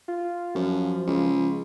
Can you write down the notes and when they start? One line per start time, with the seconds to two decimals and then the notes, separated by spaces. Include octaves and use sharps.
0.08 F4
0.55 F#2 F3
1.07 C#2